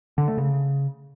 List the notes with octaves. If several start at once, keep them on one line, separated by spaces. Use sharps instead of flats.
D3
A3
C#3